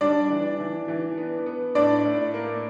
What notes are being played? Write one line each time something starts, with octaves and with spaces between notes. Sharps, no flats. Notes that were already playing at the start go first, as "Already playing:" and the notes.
G3 D4 D5
E3
E3
E3
B3
B3
A2 D4 D5
A2
A#3